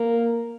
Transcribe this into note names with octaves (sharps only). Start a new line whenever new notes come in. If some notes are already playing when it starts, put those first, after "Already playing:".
Already playing: A#3